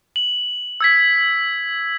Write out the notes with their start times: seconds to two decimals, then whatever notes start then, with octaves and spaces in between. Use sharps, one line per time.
0.16 F#7
0.81 E6 G#6 B6